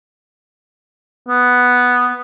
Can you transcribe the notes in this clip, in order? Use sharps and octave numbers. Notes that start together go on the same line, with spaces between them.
B3